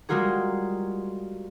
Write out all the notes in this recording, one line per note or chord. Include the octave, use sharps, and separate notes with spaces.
G3 G#3 A#3 F4 F#4 G#4